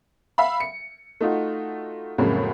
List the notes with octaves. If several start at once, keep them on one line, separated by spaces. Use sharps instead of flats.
E5 F5 B5
C#7
A3 D#4 F4 F#4
F2 A2 C#3 F#3 G#3 A#3